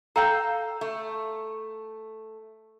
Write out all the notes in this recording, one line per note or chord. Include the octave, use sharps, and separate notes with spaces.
A4 F5 G5 A#5
A3